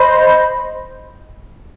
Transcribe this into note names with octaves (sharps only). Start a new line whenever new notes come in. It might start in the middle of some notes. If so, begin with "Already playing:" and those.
Already playing: C5 D#5 B5